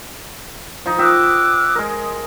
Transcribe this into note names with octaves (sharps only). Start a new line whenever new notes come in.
F3 D#4
D#5 E5 G5 D6 E6 F#6
G#3 A#4